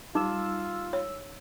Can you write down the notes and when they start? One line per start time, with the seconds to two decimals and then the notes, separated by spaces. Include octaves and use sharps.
0.15 G3 D#4 F4 D6 E6
0.93 C#5